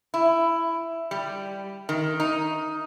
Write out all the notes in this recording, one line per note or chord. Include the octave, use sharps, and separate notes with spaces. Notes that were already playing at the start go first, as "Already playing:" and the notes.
E4
G3
D#3
D#4